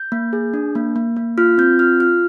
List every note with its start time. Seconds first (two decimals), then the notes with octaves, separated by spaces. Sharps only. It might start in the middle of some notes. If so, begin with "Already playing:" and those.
Already playing: G6
0.12 A#3
0.33 G#4
0.54 D4
0.75 A#3
0.96 A#3
1.17 A#3
1.38 F4 F6
1.58 C4 G6
1.79 F4 F6
2.00 F4 F6